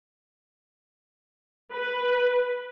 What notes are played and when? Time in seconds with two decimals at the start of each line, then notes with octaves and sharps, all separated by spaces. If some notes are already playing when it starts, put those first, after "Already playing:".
1.72 B4